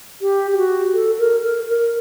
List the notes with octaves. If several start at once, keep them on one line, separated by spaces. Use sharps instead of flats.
G4
G4
F#4
A4
A#4
A#4
A#4